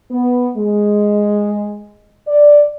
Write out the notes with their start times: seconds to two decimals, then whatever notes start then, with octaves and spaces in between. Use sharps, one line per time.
0.10 B3
0.56 G#3
2.27 D5